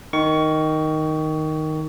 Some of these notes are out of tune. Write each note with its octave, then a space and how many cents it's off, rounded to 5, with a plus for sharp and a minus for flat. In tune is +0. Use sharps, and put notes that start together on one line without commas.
D#3 +0 C#6 +20